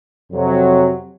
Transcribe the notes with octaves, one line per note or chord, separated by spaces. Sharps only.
F2 C3 F#3